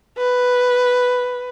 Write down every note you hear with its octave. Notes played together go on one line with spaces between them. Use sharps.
B4